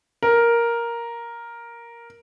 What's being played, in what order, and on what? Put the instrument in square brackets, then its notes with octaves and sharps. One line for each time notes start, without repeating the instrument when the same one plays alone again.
[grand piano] A#4